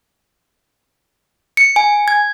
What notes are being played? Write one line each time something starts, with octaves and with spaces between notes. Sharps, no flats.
C#7
G#5
G#6